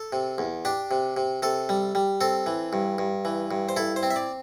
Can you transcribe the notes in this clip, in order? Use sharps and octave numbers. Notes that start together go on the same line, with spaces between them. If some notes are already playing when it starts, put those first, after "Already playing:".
Already playing: A4
C3
E2
D4 G4
C3
C3
C3 A4
G3
G3
C4 A4
E3
G2
G2
E3
G2
C5
E4 A4
C5
C4
E5
D5